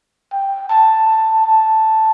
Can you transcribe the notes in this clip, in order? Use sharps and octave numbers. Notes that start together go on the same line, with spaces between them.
G5
A5
A5
A5